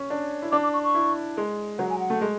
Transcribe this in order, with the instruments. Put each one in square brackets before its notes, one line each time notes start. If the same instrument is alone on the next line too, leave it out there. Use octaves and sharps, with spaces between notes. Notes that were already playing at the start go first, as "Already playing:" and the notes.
Already playing: [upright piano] C#4
D4
E4
[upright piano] D4 [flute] D6
[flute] D6
C#6
C#6
[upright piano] E4
G#3
[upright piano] F#3 [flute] F#5
[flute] G#5
F#5
[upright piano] A3
G#3